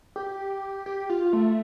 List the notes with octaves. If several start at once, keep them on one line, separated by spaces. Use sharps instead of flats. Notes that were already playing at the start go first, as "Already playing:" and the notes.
G4
G4
F4
A3